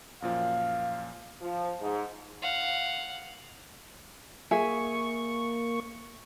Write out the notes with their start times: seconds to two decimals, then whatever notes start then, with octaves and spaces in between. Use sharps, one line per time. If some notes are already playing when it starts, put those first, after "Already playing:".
0.22 F#2 A#2 F3 F5
1.41 F3
1.81 G#2
2.42 F5 F#5
4.51 A#3 G#4 E5 C#6